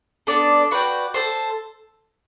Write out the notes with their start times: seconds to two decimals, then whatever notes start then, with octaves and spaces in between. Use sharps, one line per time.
0.27 B3 D4 A4 D5
0.71 F#4 B4 D5 G5
1.14 A4 C5